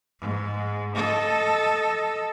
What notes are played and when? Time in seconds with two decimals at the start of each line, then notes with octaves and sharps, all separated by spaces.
0.20 G#2
0.95 A4 D#5